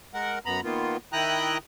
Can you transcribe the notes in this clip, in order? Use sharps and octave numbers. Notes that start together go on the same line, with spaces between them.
G#3 A#4 F#5
F#2 B3 A#5 B5
D#3 A#3 B3 F4
D#3 E4 G5 A#5 D#6 F#6